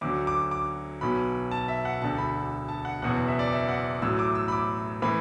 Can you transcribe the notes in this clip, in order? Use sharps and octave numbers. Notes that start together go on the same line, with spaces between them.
D2 D3 F#3 D6
D6
D6
B1 B2 F#3 B5
A5
E5
F#5
E1 D2 D3 A5
B5
A5
F#5
F#1 E2 B2 F#3 F#5
E5
D5
E5
F#5
A1 A2 F#3 E6
D6
E6
B5
D6
A2 E3 B5